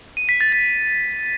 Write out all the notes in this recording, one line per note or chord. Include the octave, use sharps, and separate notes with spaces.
D#7
B6
A6
A6